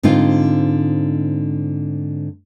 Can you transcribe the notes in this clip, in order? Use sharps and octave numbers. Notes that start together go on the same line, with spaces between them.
G#2 D3 C4 D#4 F4